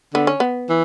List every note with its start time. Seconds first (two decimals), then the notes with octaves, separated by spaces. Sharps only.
0.14 D3 B3
0.27 C#4
0.40 B3
0.69 E3